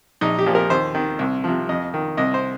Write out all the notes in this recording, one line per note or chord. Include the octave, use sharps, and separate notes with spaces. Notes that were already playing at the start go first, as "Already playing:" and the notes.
A#1 D#4
G4
A#2 F3
A#4
D#2 C5
D#3
C2
C3 F3
F2 D#5
D#3
C2 D#5
C5